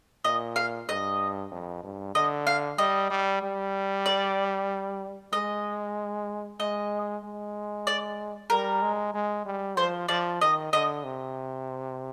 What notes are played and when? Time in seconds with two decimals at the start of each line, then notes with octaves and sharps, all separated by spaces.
0.24 A#2 D#5
0.56 F5
0.88 G2 D#5
1.51 F2
1.83 G2
2.15 D3 D#5
2.47 F5
2.78 G3 D#5
3.10 G3
3.42 G3
4.06 D5
5.33 G#3 D#5
6.60 G#3 D#5
7.24 G#3
7.87 D5
8.50 G3 A#4
8.82 G#3
9.14 G#3
9.46 G3
9.77 F3 C5
10.09 F3 D5
10.41 D#3 D#5
10.73 D3 D#5
11.04 C3